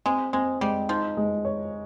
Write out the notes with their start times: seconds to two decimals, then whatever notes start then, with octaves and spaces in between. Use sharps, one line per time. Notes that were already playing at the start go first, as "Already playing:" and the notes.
0.06 G#3 C4
0.33 G#3 C4
0.61 G3 G#3
0.89 F3 D#4
1.17 G#3
1.45 C#5